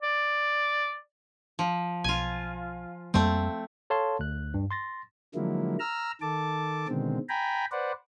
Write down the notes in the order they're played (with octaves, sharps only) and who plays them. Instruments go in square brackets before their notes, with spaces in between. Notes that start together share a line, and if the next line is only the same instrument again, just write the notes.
[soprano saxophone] D5
[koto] F3
[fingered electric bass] B1 [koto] F4 G#5
[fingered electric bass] F2 G3 A#3 [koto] A3 C4
[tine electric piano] A4 C#5 F5 A5 C6
D2 F#6
G2
C6 A6 A#6
[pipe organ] D3 F3 F#3 G#3 A#3 E4
A#5 E6 F6
D#3 A4 A5 D6
B2 D3 D#3 G#3 C4
G5 G#5 A#5 B5
B4 C5 D5 F#5